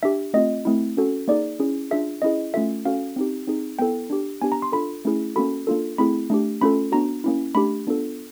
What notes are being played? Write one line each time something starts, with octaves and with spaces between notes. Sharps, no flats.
D4 G4 E5
A3 C4 F4 D#5
A3 C4 E4
C#4 F#4 A4
A#3 D#4 G#4 D5
C#4 E4 G#4
D4 F4 G#4 E5
C#4 E4 G#4 D#5
A3 C#4 F4 A4 E5
C#4 F#4 A4 F5
C4 D#4 G4
C4 D#4 G#4
B3 E4 A4 G5
D4 G4
B3 D4 G4 G#5
A#5
C6
D4 F4 A4 B5
A3 C#4 E4 G#4
A#3 C#4 F#4 A4 B5
A#3 D4 F4 A4
A3 C4 E4 G#4 B5
A3 D4 G4
A3 C#4 F4 A4 B5
B3 D4 F#4 A#5
A#3 C#4 E4
A3 D4 G4 B5
B3 D4 F4 A4